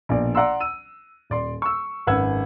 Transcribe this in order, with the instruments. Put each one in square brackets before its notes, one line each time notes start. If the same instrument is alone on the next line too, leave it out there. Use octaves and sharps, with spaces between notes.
[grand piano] A#1 B2 D5
D5 F#5 A#5 C6 E6
E6 D#7
D#1 D5 C6
C#6 E6
G#1 F#2 B4 F#5 E6 G#6